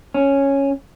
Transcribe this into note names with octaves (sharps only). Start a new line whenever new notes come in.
C#4